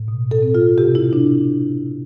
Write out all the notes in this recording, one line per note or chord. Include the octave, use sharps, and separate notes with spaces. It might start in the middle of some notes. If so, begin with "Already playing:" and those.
Already playing: A2
B2
A4
C4
F4
C3 G4
E4
C3 D4